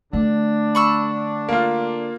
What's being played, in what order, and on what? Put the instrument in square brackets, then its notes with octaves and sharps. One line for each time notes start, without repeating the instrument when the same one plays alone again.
[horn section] D3 D4 [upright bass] A3
[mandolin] B5 C#6 E6
[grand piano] A#3 F4